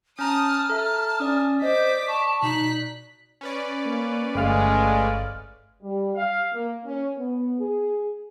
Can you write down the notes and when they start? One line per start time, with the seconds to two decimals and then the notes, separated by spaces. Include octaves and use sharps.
0.19 C#4 A5 A#5 D#6 F6
0.69 A4 E5 A5 A#5
1.20 C#4 D5 D#6
1.62 C5 D#5 D6 B6
2.08 A5 C#6
2.43 B2 D#4 F#6 B6
3.41 C#4 B4 D5
3.85 A#3
4.35 G1 G#3 A3 F5 F6
5.82 G3
6.14 F5
6.52 A#3
6.84 C#4
7.17 B3
7.59 G#4